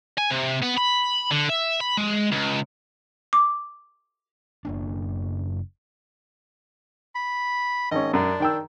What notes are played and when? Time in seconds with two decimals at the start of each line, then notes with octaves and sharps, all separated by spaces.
0.18 G#5
0.30 C3
0.63 B3
0.78 B5
1.31 D3
1.49 E5
1.80 B5
1.97 G#3
2.32 C#2
3.33 D6
4.65 F#1 A#3 D4
7.15 B5
7.92 G#1 C#4 D#5
8.13 F#2 D4
8.40 D#3 G5 E6